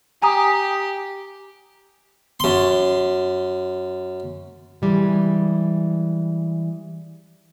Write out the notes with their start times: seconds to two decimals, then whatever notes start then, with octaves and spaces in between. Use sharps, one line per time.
0.22 G4 G#5 A#5 D#6
2.40 F#2 C6
4.82 E3 G3 G#3